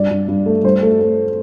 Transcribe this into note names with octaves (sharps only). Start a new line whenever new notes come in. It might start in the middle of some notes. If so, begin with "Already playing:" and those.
Already playing: G2 D5
G2
G2
A3
G2 C5
A3
A3